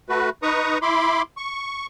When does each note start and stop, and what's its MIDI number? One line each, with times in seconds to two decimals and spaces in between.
0.09 0.30 57
0.09 0.30 66
0.09 0.30 71
0.43 0.78 63
0.43 0.78 71
0.43 0.78 82
0.43 0.78 85
0.43 0.78 87
0.82 1.22 64
0.82 1.22 83
0.82 1.22 84
0.82 1.22 86
1.37 1.86 85